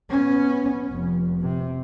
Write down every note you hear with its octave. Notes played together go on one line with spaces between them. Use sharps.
B3 C#4
F1
C3